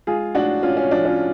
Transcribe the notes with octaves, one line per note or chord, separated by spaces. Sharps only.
G#3 F4 G#4
A2 D4 F#4
A2 C#4 F4
C#4
F3 D4
C#4 F4